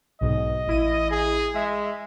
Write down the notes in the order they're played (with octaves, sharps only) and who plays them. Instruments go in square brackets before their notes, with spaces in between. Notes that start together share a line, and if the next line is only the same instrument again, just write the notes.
[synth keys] B1 G#2 B2 [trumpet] D#5
[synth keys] A1 E4 D#7
[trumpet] G#4
[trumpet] G#3 [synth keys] E5